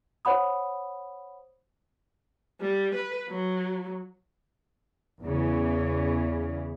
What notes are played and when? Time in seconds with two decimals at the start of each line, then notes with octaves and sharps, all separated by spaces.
0.25 C5 C#5 F#5 B5 D#6
2.61 G3
2.95 B4
3.29 F#3
5.23 E2 C#3 E3